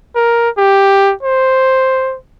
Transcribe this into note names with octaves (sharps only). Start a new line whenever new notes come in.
A#4
G4
C5